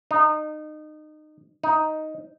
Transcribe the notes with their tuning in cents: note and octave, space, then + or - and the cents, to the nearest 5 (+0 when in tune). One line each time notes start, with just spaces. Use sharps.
D#4 -25
D#4 +5